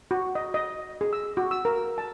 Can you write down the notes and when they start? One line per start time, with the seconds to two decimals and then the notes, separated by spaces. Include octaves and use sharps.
0.11 F#4
0.35 D#5
0.54 D#5
1.01 G#4
1.13 E6
1.37 F#4
1.51 E6
1.65 A#4
1.98 A5